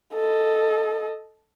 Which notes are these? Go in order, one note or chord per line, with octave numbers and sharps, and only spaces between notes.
A4 D#5